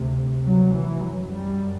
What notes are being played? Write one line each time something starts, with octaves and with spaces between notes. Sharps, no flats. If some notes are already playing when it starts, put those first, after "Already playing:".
Already playing: D2 C3
F#3
E3
F#2 F#3
G3